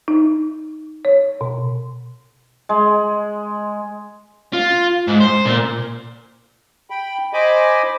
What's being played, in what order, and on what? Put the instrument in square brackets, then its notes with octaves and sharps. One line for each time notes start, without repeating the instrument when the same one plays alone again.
[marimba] D#4
C#5
B2
[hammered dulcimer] G#3
[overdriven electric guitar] F4
G#2
C5
A#2
[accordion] G5 B5
C5 D#5 G#5 B5 D6